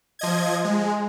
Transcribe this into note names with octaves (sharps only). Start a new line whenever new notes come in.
F3 D#5 G#6
G#3